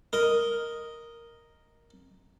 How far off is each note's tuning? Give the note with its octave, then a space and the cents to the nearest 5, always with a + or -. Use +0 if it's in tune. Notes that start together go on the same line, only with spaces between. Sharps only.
A#4 +0 D#5 +0